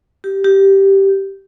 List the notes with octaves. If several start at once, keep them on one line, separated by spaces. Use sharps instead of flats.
G4
G4